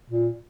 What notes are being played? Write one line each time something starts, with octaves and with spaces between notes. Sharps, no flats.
A#2